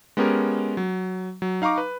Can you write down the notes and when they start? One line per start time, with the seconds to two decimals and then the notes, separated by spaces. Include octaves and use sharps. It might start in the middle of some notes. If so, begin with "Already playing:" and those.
0.17 G#3 B3 C#4 G4 A#4
0.77 F#3
1.42 F#3
1.62 D#4 F5 A#5 C#6 D6
1.78 B4